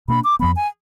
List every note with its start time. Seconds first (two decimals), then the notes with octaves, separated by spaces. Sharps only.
0.08 B2 A#3 D4 B5
0.24 D6
0.39 F2 F3 B3 B5
0.56 G#5